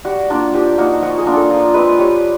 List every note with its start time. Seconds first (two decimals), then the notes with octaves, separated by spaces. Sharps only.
0.05 G3 F#4
0.30 A#3 D4 F4
0.54 F3 G4
0.78 A#3 D#4 F#4
1.02 F3 F#4
1.18 G#4
1.26 A#3 D4 F4
1.34 A4
1.50 F3 A#4
1.74 G#3 C4 B4
1.98 G3 C#5